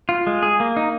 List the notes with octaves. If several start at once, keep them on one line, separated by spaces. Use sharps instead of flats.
F4
G#3
G#4
A#3
D#4